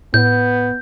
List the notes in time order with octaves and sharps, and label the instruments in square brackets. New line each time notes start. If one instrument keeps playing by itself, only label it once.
[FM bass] A2 [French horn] B3 [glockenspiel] G6